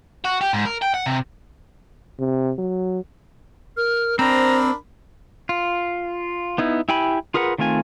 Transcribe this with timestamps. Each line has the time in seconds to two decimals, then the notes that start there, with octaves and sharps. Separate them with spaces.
0.25 F#4
0.41 G4
0.53 G#2
0.65 A#4
0.82 G5
0.94 F#5
1.06 C3
2.19 C3
2.58 F#3
3.77 A#4 F6
4.19 C4 D4 A#4 C5 A#5 B5
5.49 F4
6.58 B3 D#4 E4
6.89 E4 G4 G5 G#5 B5
7.34 F4 G#4 A#4 B4 F#5
7.58 D#3 A3 C4 F4 G#5